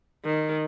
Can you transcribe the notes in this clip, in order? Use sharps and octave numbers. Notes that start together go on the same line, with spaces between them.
D#3